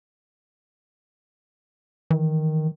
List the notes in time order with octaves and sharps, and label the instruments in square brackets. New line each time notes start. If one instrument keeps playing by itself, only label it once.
[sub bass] D#3 [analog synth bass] E3